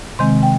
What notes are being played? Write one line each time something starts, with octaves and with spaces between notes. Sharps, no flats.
C3 D#3 G#3 C4 C6
G5